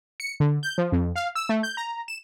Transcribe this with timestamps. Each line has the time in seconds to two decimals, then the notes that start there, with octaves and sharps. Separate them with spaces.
0.20 C#7
0.40 D3
0.63 G6
0.78 F3
0.92 F2
1.16 F5
1.35 E6
1.49 A3
1.63 G6
1.77 A#5
2.08 E7